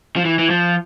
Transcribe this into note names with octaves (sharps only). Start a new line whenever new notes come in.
F3
E3
E3
F3